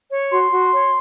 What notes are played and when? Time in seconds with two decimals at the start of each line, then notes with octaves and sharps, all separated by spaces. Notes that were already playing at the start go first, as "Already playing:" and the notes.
0.10 C#5
0.31 F#4 C6
0.51 F#4
0.72 C#5